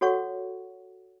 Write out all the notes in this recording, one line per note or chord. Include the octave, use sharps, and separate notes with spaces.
F#4 A4 C#5 F#5 C#6